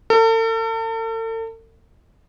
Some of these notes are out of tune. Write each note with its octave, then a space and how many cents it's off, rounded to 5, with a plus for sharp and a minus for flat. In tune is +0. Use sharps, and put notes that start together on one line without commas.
A4 +40